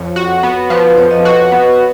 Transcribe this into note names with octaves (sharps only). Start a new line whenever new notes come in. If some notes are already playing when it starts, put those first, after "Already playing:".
Already playing: F2 C#5
F#4
B3
F3 B4
F2 C#5
D#5
F#4
B3